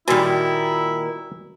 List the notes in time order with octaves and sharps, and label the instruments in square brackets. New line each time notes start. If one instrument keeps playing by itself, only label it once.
[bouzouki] A#2 D#3 [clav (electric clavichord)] G3 E5 G#5 [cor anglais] E4 [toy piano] F#4